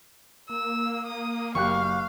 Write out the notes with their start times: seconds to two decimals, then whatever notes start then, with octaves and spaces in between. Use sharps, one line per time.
0.49 A#3 E6
1.06 D#6
1.55 F#1 G4 F5 C#6 F#6